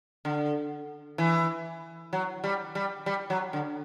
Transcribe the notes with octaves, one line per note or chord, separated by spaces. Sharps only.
D3
E3
F#3
G3
G3
G3
F#3
D3